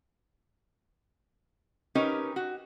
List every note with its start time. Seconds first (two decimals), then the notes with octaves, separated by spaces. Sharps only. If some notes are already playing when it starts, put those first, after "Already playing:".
1.95 C#4 D#4 G4 A#4 B4
2.36 F#4